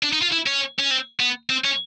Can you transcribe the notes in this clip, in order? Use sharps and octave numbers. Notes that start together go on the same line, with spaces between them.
D4
D#4
F4
E4
C#4
C#4
C4
B3
C4
C#4